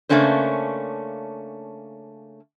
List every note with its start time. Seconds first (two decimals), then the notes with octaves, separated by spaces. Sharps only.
0.09 C#3 A3 A#3 C#4 D4 C5